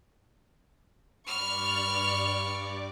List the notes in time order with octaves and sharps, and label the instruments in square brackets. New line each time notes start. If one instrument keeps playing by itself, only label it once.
[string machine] G2 D5 D6 [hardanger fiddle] B5 C#6 [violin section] F6